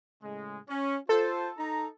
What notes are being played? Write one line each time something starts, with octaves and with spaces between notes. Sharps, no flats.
A2 C#3 G#3
C#4
F4 A4 C5
D#4 A#5